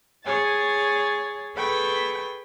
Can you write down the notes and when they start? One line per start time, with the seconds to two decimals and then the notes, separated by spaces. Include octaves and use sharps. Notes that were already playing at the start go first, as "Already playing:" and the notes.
0.24 G#4 C#5 G#5 A6
1.56 G#4 A4 B4 G5 B5 C#6